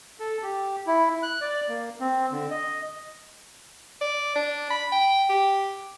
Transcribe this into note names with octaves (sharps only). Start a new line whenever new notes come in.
A4
G4
E4
F#6
D5
A#3
C4
D3
D#5
D5
D4
B5
G5
G4